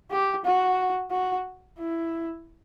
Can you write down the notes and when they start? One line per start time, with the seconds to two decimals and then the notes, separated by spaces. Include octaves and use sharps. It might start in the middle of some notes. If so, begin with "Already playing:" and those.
0.11 G4
0.45 F#4
1.11 F#4
1.78 E4